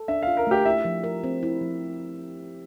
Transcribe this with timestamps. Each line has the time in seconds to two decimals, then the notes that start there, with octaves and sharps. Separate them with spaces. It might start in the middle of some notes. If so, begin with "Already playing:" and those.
Already playing: A4
0.08 D4 E5
0.23 F4 F5
0.37 A#4
0.47 A3 G4
0.65 E4 E5
0.85 F3
1.04 A#4
1.24 C4
1.43 E4
1.61 F3